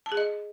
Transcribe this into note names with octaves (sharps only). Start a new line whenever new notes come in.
A5
G#4
D#5